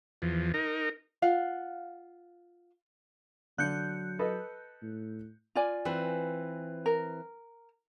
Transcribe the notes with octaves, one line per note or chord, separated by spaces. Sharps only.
E2 F3
D#4 A#4
F4 F5 F#5
D3 F#3 F#6 G6 C#7
A4 B4 D#5
A2
F4 D5 G#5
E3 C4 B4
A#4